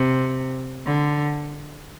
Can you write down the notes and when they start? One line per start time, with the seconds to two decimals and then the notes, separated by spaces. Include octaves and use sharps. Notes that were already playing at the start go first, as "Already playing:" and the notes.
Already playing: C3
0.86 D3